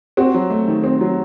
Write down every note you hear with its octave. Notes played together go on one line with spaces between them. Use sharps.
C4 F#4
F#3
A3
D#3
C4
F#3